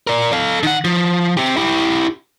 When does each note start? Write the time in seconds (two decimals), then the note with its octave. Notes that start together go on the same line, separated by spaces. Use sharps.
0.07 A#4 D5
0.33 A4 F5
0.63 D#3 F#5
0.85 F3
1.37 C4 G4
1.57 E4 G4